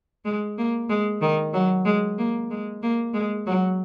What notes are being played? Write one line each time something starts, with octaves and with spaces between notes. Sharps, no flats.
G#3
A#3
G#3
D#3
F#3
G#3
A#3
G#3
A#3
G#3
F#3